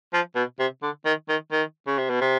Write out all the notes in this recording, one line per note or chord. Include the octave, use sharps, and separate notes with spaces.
F3
B2
C3
D3
D#3
D#3
D#3
C#3
C3
B2
C3